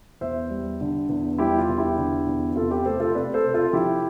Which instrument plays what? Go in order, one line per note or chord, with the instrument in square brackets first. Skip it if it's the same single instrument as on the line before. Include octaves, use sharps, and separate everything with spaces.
[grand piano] E2 C5 E5
G3
D3
E2
G3 E4 G4
F4
E2
E4 G4
D3
E2
C3 F4 A4
G4 B4
A3 A4 C5
F4 A4
C3 B4 D5
A4 C5
C3
F4 A4
F3 E4 G4